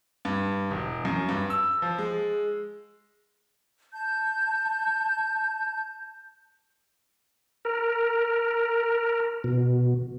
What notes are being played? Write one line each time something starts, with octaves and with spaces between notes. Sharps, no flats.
G2
E1
F#2
G2
E6
F3
G#3
A5 G6
A#4
B2